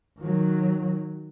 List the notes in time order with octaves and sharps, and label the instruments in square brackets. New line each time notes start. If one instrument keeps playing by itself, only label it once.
[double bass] D#3 F#3